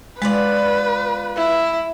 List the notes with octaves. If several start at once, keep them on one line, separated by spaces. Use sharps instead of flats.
G#3 B3 F4 B4 D5
E4